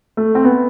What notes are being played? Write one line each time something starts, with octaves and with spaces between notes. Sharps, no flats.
A3
C4
B3